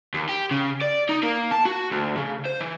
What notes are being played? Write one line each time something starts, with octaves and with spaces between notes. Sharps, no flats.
D#2
G4
C#3
D5
D#4
A#3
A5
F#4
D2
C#3
C5
E3